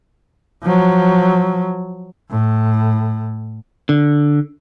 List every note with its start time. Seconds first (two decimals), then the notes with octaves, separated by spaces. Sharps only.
0.64 F3 F#3
2.30 A2
3.89 D3